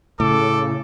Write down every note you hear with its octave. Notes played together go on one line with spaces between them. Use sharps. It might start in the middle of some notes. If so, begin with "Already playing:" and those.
A2 C#3 A4 D6